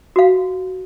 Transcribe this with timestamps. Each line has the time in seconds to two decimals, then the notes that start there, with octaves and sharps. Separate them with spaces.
0.16 F#4 F5